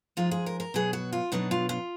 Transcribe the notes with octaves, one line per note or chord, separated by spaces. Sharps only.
F3 G#3 D#4 F4
G#4
A#4
A#4
B2 F#3 B3 G#4
F#4
F4
B2 F#3 B3 D4 D#4
F4
F4